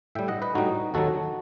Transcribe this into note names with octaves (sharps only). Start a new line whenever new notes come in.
A2 G3 E5 G5
D#5 F#5
B4 D#5
A2 G3 D#4 F#4
D#2 D#3 F#3 F#4 A4